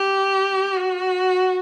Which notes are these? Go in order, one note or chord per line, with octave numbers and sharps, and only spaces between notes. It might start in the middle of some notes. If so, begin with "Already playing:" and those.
Already playing: G4
F#4